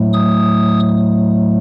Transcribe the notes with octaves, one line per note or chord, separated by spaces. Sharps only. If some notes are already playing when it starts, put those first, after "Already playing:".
Already playing: A2 F#3 A3
D#6